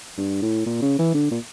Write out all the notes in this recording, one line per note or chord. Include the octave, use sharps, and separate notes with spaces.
G2
A2
A#2
C#3
E3
D3
A#2